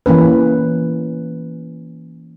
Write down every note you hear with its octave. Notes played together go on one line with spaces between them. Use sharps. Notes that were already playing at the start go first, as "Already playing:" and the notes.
E3 A#3 C#4 B4